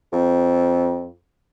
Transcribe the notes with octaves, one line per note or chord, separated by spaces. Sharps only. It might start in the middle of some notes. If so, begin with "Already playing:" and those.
F2